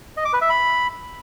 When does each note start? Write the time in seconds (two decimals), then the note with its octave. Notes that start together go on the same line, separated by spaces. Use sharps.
0.17 D#5
0.25 D6
0.33 B4
0.41 E5
0.50 B5